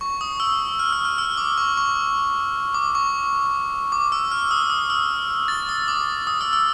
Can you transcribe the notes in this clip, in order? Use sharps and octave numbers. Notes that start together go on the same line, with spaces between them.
C#6
D#6
E6
F6
E6
F6
E6
D6
C#6
C#6
D6
C#6
D6
E6
F6
D#6
D#6
E6
A6
D#6
D6
D#6
E6
E6